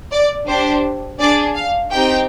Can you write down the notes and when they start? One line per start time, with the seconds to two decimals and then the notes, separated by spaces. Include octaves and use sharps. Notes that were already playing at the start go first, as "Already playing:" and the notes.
0.11 D5
0.47 D4 G4 C5
1.19 D4 G#4 D5
1.54 F5
1.90 C4 D#4 G4 G5